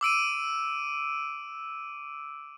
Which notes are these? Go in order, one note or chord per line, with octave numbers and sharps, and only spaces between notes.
D6 E6 D7 D#7